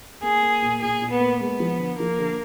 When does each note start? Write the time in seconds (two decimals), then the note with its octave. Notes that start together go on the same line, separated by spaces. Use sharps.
0.23 A#3 G#4
0.42 A#3
0.62 A#2
0.81 A#2 G#4
1.02 A#2
1.11 B3
1.20 A#3
1.40 G#3 B3
1.60 F3
1.79 D3
1.99 F3 A#3
2.18 D3